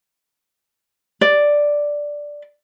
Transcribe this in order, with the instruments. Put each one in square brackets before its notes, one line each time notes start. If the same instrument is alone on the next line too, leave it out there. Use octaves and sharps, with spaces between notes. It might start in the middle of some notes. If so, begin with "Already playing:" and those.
[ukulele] D5